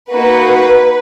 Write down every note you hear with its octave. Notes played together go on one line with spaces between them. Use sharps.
A#3 D#4 F#4 B4